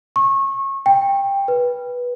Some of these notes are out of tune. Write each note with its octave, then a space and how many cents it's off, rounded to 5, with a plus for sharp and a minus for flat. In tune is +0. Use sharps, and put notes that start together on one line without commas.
C#6 -25
G5 +15
B4 -10